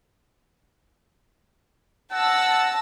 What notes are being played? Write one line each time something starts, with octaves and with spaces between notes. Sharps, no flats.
F#5 A5 E6 A#6